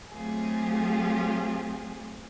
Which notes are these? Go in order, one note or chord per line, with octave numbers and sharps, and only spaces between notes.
F#3 A3 C4 F4 G4 G#4